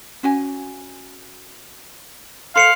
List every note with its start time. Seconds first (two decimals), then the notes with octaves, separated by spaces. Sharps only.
0.23 C#4 F#4 G#5
2.56 A4 C5 F5 C6 C#7 F7